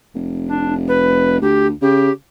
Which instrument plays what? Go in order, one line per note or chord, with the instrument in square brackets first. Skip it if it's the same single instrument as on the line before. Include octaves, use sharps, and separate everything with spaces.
[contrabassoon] F1
[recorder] D4
B4
[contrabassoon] D2 [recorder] G4
[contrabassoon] C#3 [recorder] G4